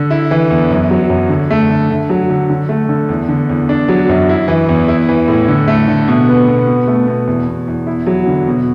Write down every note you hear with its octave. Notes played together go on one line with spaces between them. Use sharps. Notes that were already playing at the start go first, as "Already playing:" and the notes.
Already playing: D3
E4
E3
E2
F#2
F#3
F#2
D3
A3
D3
D3
F#3
D3
D3
A3
D3
E2
D3
E2
D4
F#3
F#2
E4
E3
E2
E4
E3
A2
D3
A3
D3
B2
B3
B2
B2
A3
B2
E2
B2
E2
E4
F#3
D3
B2